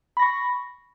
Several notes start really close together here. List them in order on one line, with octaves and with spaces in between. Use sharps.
B5 A#6 C#6